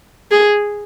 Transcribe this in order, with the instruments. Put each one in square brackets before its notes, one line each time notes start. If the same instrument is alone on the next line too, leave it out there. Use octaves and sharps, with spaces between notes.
[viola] G#4